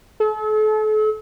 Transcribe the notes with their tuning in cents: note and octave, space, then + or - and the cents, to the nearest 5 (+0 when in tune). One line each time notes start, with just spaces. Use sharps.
A4 -40